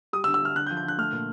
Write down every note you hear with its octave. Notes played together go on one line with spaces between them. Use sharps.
G3 D#6
E6
D3
E6
D3 F6
D3 F#6
G6
F3
G6
D3 F#6
A3 F6
A#2